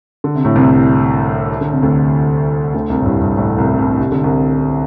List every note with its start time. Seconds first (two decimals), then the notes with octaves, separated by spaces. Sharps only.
0.24 D3
0.35 C3
0.45 A2
0.55 C2 C3
1.61 D3
1.72 C3
1.82 D2 D3
2.74 D2 D3
2.90 C2 C3
3.01 A2
3.06 G2
3.21 G2
3.36 A1 A2
3.58 C2 C3
3.79 C2 C3
3.99 C3
4.12 D3
4.23 C2 C3